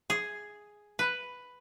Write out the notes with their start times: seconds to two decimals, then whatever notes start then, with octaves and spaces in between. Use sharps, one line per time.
0.10 G#4
0.99 B4